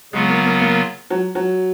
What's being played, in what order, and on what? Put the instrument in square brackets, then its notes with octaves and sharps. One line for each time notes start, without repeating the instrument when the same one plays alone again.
[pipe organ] C#3 F#3 B3 F4 [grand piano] G#3
[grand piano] A#3
A#3
A#3
F#3
F#3